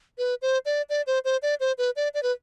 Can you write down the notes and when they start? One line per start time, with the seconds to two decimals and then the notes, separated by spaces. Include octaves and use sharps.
0.18 B4
0.42 C5
0.65 D5
0.89 D5
1.07 C5
1.25 C5
1.42 D5
1.60 C5
1.78 B4
1.96 D5
2.14 D5
2.23 B4